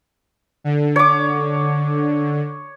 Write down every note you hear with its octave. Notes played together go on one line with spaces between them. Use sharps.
D3
C#5 D6